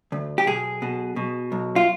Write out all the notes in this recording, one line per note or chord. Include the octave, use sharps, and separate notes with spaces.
D2
G4
B1 G#4
B2
B2
B1
F4